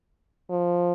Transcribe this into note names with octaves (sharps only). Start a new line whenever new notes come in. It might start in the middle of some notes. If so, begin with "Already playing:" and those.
F3